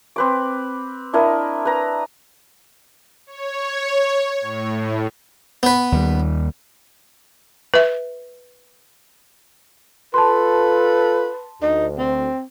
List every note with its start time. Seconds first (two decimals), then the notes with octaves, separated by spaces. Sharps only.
0.16 C4 B4 D6
1.13 D4 E4 A#4 D#5
1.65 B4 A#5
3.27 C#5
4.41 A2
5.63 B3 B4
5.92 D#2 G3
7.74 B4 E5
10.14 F4 A4 B4 A5 C6
11.62 D2 D#4
11.98 C4